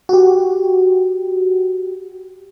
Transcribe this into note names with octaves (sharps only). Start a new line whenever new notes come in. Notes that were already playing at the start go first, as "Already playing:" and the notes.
F#4 G4